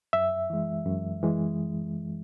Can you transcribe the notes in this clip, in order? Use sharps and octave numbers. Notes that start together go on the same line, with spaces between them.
F#2 E5
E3 G#3
F#2
E3 G#3